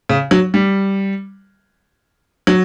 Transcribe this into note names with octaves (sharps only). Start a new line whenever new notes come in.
C#3
F#3
G3
F#3